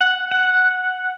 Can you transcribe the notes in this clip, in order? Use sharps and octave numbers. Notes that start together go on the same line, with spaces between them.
F#5
F#5